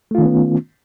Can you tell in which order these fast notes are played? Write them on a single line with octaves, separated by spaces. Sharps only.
A3 F4 D#3 C#4 B3